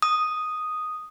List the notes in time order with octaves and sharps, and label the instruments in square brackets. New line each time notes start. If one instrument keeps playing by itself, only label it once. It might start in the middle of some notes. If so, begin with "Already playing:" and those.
[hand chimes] D#6